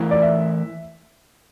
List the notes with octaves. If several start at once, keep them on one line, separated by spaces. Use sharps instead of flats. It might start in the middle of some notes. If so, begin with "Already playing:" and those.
Already playing: E3 A3 E4 A#4
D5
E5